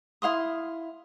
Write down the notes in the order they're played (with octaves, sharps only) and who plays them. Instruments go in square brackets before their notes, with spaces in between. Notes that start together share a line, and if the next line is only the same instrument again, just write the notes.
[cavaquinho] E4 F5 C6 D#6